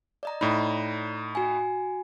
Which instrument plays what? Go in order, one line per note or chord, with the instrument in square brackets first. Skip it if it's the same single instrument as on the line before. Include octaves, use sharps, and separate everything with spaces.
[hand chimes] D5 D#5 A#5
[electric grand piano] A2 D#4 [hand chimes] D5 A#5 B5
[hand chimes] F#4 G#5